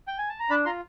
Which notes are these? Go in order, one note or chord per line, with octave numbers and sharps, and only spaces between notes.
G5
G#5
A5
A#5
D4 A5 B5
F4 A#5 C6